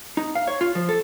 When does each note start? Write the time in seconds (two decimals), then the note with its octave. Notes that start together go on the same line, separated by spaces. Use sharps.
0.17 D#4
0.35 F5
0.47 C#5
0.61 F4
0.75 F3
0.89 A4